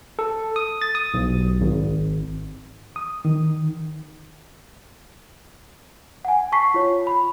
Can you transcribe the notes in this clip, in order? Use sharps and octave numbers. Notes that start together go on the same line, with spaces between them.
A4
D#6
A6
D#6
B1
G#1
D#6
D#3
F#5 G#5
A5 C#6 B6 C7
F4 C#5
B5